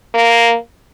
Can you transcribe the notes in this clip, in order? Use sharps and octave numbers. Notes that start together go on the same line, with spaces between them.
A#3